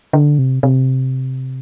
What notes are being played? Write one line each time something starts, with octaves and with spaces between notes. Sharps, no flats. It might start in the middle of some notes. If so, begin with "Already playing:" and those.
D3
C3
C3